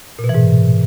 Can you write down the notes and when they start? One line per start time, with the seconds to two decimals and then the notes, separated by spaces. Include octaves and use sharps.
0.19 A#2
0.24 B2
0.29 E3
0.35 G#2